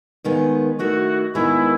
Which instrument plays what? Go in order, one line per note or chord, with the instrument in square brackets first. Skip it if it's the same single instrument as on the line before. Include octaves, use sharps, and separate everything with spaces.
[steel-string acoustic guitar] D#2 D#3 G#3 B3
[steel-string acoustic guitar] D#3 A3 E4 [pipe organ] F#4
[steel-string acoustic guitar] D#2 D#3 G#3 B3 [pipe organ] E4